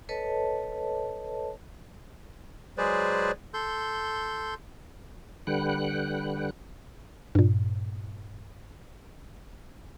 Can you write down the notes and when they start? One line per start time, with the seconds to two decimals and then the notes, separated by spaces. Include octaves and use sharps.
0.09 A4 B4 C#5 D#5 A5
2.78 F#3 G#3 G#4 B4 C5 D5
3.54 A4 C6 G6
5.47 D3 G3 B4 F#5 G5 F#6
7.35 G2 A#2